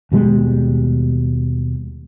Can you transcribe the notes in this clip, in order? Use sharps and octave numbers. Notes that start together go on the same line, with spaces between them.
D#2 B2 G3 G#3